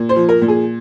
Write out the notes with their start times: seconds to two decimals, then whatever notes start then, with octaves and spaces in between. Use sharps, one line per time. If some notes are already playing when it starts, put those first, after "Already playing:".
Already playing: A#2
0.09 C5
0.16 F3
0.29 A#4
0.42 A#2
0.48 G#4